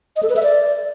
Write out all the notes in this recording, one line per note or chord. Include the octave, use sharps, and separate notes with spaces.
D#5
A4
B4
E5
D5